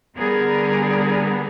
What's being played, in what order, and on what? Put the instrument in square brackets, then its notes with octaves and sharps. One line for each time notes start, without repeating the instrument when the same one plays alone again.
[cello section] D3 G3 B3 G#4 A#4